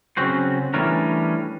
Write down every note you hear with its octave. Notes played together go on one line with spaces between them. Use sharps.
C#3 F#3 C4 C#4 F#4 C5
E3 G3 A3 C#4 D4 A#4